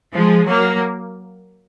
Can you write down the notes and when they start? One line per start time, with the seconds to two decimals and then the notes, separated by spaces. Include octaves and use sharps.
0.14 F3 G#3
0.48 F#3 A#3